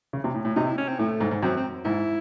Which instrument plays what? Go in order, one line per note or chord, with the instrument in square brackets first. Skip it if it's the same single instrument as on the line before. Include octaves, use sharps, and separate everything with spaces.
[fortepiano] C#3
C3
A2
A2
[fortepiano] C3 [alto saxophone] D#4
[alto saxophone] E4
C#4
C4
[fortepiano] A2 [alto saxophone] A3
[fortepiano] G#2
G#2
[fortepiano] F#2 [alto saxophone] C4
[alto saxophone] C4
[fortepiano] G#2 [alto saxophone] E4